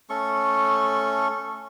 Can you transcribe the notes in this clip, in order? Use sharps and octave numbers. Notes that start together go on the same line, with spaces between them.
A3 C#4 A4 C#6